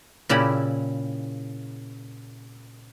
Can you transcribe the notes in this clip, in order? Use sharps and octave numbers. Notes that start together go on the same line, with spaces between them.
A#2 C#3 E4 G4 B5